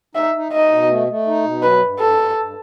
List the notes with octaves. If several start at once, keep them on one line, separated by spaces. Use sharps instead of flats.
D#4 E5
D#4
D#4 D#5
B2
A3
A3
D#4
B2
F#3 B4
G2
G2 A4
G2
G2